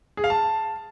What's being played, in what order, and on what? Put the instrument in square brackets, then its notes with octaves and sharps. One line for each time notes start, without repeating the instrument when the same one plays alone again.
[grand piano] G#4
F5
A5